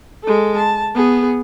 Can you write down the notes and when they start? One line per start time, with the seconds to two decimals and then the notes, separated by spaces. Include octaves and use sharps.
0.23 G#3 A4
0.57 A5
0.94 B3 G#4